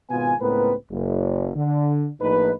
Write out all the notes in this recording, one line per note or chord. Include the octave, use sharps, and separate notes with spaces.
G#1 B2 B3 F4 G#5
C#2 A2 B3 C4 A#4 B4
F#1
D3
A#1 A2 D#4 B4